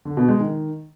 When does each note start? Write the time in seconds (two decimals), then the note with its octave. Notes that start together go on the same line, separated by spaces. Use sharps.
0.05 D3
0.17 B2
0.29 G#3
0.40 D#3